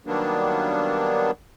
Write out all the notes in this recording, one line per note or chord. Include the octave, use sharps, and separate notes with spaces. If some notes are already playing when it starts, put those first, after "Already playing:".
D#3 F#3 G3 A#3 B3 D4